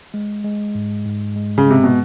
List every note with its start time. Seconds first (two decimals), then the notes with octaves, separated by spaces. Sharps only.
0.14 G#3
0.44 G#3
0.75 G#2
1.06 G#2
1.36 G#3
1.58 C#3
1.66 C3 G#3
1.84 B2